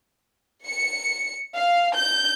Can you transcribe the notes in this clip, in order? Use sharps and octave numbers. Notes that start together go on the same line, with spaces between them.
C#7
F5
G6